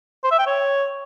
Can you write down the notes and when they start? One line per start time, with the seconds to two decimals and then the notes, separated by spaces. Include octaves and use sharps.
0.24 C5
0.31 E5
0.39 G5
0.46 C#5